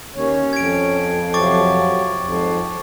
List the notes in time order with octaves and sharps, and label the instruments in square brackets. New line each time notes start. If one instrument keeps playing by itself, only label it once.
[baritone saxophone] D#2 [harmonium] C#4 C#5
[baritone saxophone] F2 [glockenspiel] G#6 D7
[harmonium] C3 F3 F#3 [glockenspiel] C#6 D6 A6
[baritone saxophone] F2 [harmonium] G#2